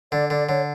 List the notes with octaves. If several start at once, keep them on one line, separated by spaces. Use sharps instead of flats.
D3 D5
D3 D5
D3 C#5